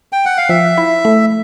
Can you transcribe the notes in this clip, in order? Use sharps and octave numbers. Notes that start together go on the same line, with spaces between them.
G5
F#5
F5
F3 E5
E4
A3